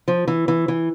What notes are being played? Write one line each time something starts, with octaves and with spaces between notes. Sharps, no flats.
F3
E3
E3
E3